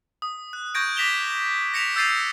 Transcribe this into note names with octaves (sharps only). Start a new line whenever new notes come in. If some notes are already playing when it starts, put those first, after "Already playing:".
D#6
F#6
C#6 G6 G#6 A#6 D7
D6 A#6 B6 E7 F7 G7
A#6 B6 C#7 E7 F7
E6 G6 A6 C7 D#7 F7